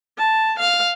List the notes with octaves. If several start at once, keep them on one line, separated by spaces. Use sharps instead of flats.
A5
F5